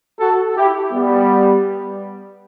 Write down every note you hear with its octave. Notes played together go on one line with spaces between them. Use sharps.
F#4 A4
E4 G4
G3 B3